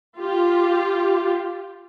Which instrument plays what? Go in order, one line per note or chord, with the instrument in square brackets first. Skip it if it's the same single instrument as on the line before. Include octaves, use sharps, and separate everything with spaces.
[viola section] F4 G4